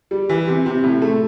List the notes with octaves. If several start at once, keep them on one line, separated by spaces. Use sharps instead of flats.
G3
E3
C3
C3
A2
A3